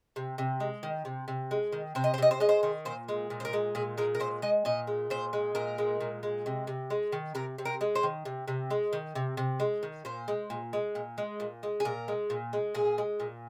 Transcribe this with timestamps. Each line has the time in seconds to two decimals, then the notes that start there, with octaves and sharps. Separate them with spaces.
0.16 C3
0.38 C3
0.60 G#3
0.83 D#3
1.05 C3
1.28 C3
1.51 G#3
1.73 D#3
1.95 C3 C5
2.04 D#5
2.14 C5
2.18 C3 D#5
2.31 C5
2.40 G#3 D#5
2.49 C5
2.63 D#3
2.85 A#2 C5
3.09 G#3
3.30 A#2
3.40 C5
3.45 A#4
3.53 G#3
3.75 A#2 G#4
3.98 G#3 A#4
4.15 A#4
4.20 A#2 C5
4.42 G#3 D#5
4.65 A#2 D#5
4.87 G#3
5.10 A#2 C5
5.33 G#3
5.55 A#2 A#4
5.78 G#3
6.00 A#2
6.23 G#3
6.46 C3
6.67 C3
6.90 G#3
7.12 D#3
7.35 C3 A#4
7.58 C3
7.65 A#4
7.81 G#3
7.95 C5
8.03 D#3
8.25 C3
8.48 C3
8.70 G#3
8.93 D#3
9.15 C3
9.37 C3
9.60 G#3
9.83 D#3
10.05 A#2 C5
10.28 G#3
10.50 A#2
10.73 G#3
10.95 A#2
11.18 G#3
11.40 A#2
11.63 G#3
11.80 G#4
11.85 A#2 A#4
12.08 G#3
12.30 A#2
12.53 G#3
12.75 A#2 G#4
12.98 G#3
13.20 A#2